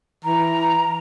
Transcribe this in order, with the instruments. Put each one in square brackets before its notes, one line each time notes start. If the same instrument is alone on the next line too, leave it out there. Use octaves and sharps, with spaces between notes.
[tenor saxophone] E3 [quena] A#5